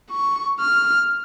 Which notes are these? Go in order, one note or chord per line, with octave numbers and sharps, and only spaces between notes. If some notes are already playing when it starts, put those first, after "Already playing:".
C#6
F6